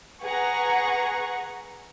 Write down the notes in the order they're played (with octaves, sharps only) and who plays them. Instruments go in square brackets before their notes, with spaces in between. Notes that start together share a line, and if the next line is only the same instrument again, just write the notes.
[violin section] G#4 B4 F#5 A#5 C#6